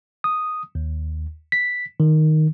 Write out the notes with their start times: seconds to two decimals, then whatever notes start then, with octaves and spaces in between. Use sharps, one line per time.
0.24 D#6
0.75 D#2
1.52 B6
2.00 D#3